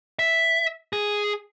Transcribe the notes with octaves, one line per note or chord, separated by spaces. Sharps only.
E5
G#4